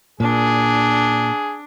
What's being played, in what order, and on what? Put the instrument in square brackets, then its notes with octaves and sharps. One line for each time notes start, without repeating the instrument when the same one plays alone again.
[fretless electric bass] A#2 [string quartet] D4 [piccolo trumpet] G#4